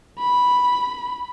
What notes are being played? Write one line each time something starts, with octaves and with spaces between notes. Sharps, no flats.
B5